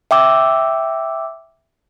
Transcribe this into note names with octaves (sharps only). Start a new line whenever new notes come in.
E5 G5 D6 E6